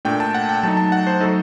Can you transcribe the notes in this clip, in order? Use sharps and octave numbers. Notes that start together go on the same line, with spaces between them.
A#2 A3 D4 G5
A5
F#5
G5
F#3 A3 D#4 A5
A5
F#5
C5
F#3 A3 D#4 A4